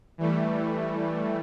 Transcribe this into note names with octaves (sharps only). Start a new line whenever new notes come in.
E3 G3 A3